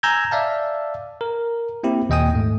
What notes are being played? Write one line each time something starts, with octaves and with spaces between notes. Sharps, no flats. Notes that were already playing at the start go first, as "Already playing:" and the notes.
G#5 A#5 E6 G6 G#6
D5 E5 F5 A5
A#4
A#3 C4 E4 G4
D#2 A#2 D#5 G5 G#5 D#6
G#2 A3